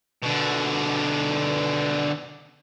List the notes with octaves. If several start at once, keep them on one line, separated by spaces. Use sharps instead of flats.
B2 D3